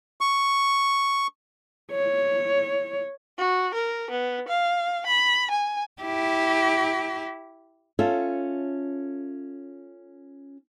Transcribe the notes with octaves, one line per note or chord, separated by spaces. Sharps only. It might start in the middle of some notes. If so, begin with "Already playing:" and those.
C#6
C#5
F#4
A#4
B3
F5
B5
G#5
E4 G4
C#4 F4 A4 E5